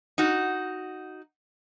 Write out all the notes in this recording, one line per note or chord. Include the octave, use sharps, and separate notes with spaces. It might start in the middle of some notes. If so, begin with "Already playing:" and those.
D#4 F#4